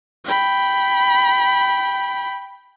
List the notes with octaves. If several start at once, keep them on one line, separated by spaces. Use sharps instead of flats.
G5 B5